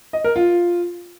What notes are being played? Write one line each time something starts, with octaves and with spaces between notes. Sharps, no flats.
D#5
A#4
F4